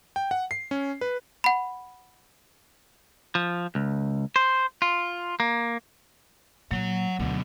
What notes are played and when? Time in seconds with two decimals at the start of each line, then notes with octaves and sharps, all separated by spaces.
0.16 G5
0.31 F#5
0.51 C7
0.71 C#4
1.01 B4
1.44 F#5 B5
3.35 F3
3.75 C#2
4.36 C5
4.82 F4
5.40 A#3
6.71 A#2 F#3 C#5 F#5
7.19 D2 B2 D3